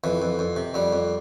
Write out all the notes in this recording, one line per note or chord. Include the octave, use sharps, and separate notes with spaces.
F2 E3
F2
F2
C3
F2 G3
F2